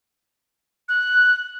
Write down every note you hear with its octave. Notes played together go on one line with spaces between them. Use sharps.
F#6